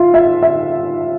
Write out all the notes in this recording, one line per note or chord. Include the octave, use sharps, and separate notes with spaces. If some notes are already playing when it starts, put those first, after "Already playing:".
Already playing: F4 E5
E5
E5